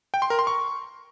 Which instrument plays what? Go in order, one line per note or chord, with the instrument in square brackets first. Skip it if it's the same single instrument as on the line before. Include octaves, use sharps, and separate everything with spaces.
[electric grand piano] G5
C6
A#4
C6
C#6